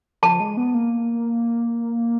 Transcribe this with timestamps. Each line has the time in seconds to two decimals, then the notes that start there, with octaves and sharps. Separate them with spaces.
0.22 F3 A5
0.40 G#3
0.57 B3
0.74 A#3